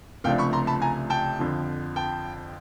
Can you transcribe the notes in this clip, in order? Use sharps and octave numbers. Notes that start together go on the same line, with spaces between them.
C#2 C3 F3 A3 D4 F5 G5
B5 C#6
A#5 C6
A5 B5
G#5 A#5
G5 A5
F2 D3 F3
G5 A5